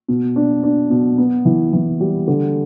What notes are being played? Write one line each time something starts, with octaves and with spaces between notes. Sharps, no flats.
B2
D4
D4
B2
B3
E3
E3
G3
D3